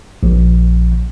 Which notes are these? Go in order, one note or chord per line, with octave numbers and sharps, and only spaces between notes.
A#1